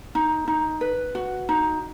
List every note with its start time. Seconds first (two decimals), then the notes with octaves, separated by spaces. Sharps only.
0.15 D#4
0.48 D#4
0.81 B4
1.15 F#4
1.49 D#4